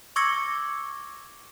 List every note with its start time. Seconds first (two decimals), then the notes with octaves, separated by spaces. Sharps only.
0.16 C#6 D6 E6 G#6 A#6 C#7